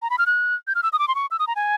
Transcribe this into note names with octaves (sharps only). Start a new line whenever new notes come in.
A#5
B5
F6
F#6
G6
F6
E6
D#6
D6
C6
C#6
E6
D#6
A#5
G#5